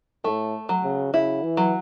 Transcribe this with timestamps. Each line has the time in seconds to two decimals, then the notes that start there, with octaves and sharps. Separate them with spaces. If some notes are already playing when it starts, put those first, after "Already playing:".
0.24 A2 A3
0.69 F#3
0.84 C#3
1.13 C#3 E4
1.43 E3
1.57 F#3